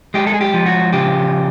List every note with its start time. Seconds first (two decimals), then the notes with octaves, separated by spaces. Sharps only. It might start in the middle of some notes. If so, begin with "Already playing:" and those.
0.14 G#3 G4
0.27 A4
0.34 G#4
0.41 G4
0.54 F3
0.66 F#4
0.93 C#3 G4